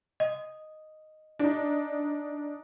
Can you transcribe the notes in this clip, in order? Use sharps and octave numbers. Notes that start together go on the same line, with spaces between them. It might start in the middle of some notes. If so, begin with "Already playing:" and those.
D#5
D4 D#4